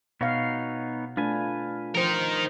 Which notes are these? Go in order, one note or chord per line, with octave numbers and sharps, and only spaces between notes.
B2 B3 D#4 C#5 F5
A3 D4 F4 B4 G#5
F3 D#4 A#4 C5